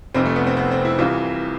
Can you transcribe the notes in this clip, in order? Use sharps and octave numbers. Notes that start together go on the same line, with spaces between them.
F1 F2 C3 C4
A3
B3
C4
B3
C4
E4
C2 C3 E3 F4